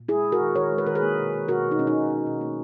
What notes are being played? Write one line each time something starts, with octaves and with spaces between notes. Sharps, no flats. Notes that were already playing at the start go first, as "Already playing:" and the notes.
Already playing: A#2
G#3 E4 G#4
G#3
F#4 A#4
D#3
D#3 A#4 C#5
G#3
B4
D#3 A#4
G#4 B4
A#3
B2
A#3
B2 F#4 A#4
B2
D#4
B2 C#4
D#4
B2
B2
B2
A#3